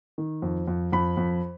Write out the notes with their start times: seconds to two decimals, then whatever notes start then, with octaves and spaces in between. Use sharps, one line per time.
0.18 D#3
0.42 F2
0.68 F2
0.92 F2 B5
1.17 F2